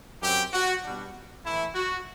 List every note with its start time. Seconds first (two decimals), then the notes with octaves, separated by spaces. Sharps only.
0.22 F#2 F#3 C4 G4
0.52 F#4
0.83 B2 G3 D4
1.44 A2 E3 A3 E4
1.74 F#4